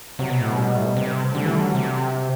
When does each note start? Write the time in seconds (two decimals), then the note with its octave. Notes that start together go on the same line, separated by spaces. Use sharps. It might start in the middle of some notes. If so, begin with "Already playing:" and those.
0.19 C3 F#3
0.30 B2
0.41 A2
0.51 B2 F#3
0.58 G3
0.76 A2
0.86 B2
0.97 C3
1.31 A3
1.35 D3 G3
1.45 E3 G3
1.56 D3
1.61 F#3
1.75 C3